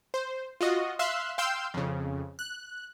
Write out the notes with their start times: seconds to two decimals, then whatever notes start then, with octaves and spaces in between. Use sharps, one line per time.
0.14 C5
0.61 F4 F#4 D#5
0.99 E5 F5 C6 E6 F#6
1.38 F5 G5 C6 E6 G6
1.74 F2 C#3
2.39 F#6